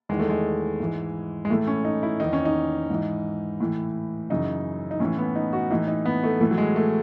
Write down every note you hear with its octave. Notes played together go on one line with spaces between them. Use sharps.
E2 D#3 G#3
A3
G#3
G#2 E3
G#3
A2 E3 A3
C#4
D#4
E4
E2 D#3 D#4
C#4
D#4
G#2 E3
A2 E3
F#2 C#3 E3 D#4
D#4
A2 E3 C#4
B3
D#4
F#4
A2 E3 D#4
D#4
B3
A3
A2 E3 A3
F#3
G#3
A3